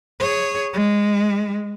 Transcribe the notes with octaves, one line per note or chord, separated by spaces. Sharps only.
G#4 C#5
G#3